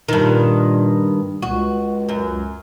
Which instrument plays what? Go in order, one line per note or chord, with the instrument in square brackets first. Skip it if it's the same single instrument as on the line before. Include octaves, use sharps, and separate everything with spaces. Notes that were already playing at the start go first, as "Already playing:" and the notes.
[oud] G2 D#3 [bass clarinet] A#2
[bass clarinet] C#2 [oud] F#4
[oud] F#2